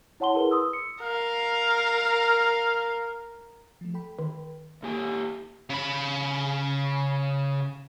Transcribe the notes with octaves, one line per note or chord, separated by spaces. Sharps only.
E4 C#5 F#5 A5 C6 G7
E4 G#4 A#4 B4
C6 D#6 E6
C#7
A#4 F5
F3 A3
A4 G5 B5
D#3
A#2 A#3 G4 A4 G#5
C#3 B5